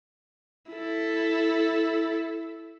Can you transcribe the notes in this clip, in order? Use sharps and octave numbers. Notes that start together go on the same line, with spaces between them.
E4 A4